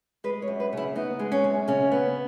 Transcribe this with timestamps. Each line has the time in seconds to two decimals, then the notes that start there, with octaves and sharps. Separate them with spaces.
0.24 G#3 B4
0.42 C#5
0.48 F#2
0.60 B4
0.73 C#3 E4
0.96 B3 D#4
1.19 G#3
1.32 C#4
1.44 F#2
1.68 C#3 C#4
1.92 B3